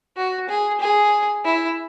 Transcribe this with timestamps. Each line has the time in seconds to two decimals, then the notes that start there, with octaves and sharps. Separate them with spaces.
0.17 F#4
0.49 G#4
0.81 G#4
1.45 E4